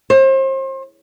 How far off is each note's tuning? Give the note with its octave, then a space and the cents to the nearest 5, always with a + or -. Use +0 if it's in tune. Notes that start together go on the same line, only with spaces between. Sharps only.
C5 +35